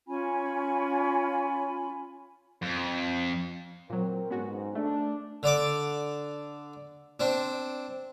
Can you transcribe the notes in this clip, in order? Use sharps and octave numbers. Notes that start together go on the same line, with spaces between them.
C#4 F4 G#5 B5
F2
A#2 F#3 C4 A#4
G#2 B3 C#4 F#4
A3 D4
D3 D5 D6
C4 D4